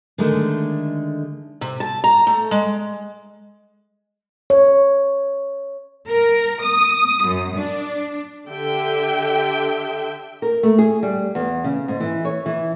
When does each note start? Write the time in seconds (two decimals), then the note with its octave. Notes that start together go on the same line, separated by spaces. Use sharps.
0.18 D3 D#3 G#3 A3
1.61 C3
1.80 A5
2.04 A#5
2.27 A3
2.51 G#3
4.50 C#5
6.09 A#4
6.64 D#6
7.26 F#2
7.58 D4
8.48 D3 G4 E5 G5
10.42 A#4
10.63 A3
10.79 G#4
11.03 G3
11.35 E2
11.64 C#3
11.88 G#2
12.00 E3
12.25 C#5
12.46 E3